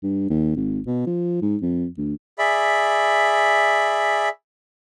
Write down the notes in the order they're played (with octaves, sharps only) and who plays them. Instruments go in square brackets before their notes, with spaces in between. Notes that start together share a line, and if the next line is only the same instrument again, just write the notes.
[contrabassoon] G2
D#2
G#1
B2
F3
G#2
F2
D2
[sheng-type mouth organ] G#4 D5 E5 B5